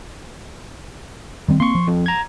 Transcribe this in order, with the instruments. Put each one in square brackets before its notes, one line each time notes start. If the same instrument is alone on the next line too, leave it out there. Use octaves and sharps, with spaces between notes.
[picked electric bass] D#3 G3 C4
[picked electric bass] A#3 C4 [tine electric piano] C6 C#6
[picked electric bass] F3
[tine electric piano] F2
A#5 G#6